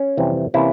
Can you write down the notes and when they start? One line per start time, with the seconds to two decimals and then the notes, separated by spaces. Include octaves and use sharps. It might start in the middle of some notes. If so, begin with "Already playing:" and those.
Already playing: C#4
0.17 F2 C3 E3 G3
0.54 C3 E3 A#3 C#4 E4